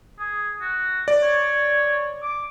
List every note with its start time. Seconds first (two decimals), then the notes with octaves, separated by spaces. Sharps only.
0.19 G#4
0.61 F#4
1.08 D5
1.23 C#5
2.22 D6